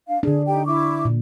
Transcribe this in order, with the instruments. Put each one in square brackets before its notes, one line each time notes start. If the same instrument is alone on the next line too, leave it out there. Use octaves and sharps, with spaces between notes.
[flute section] D4 F5
[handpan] D3 D4 [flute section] G#4
[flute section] D#4 G4 G5
E4 C#6 D6
[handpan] A#2